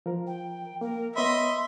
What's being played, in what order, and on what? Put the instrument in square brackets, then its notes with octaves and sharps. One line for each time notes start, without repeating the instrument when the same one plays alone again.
[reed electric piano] F3 A#4
[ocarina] G5
[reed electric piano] A#3 [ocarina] A#4
[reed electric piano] B3 C#5 B5 [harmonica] D#5 E5 [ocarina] C6
[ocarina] C6